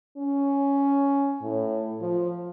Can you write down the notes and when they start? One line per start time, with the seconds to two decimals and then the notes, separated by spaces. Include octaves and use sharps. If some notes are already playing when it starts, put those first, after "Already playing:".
0.18 C#4
1.42 A2
2.01 F3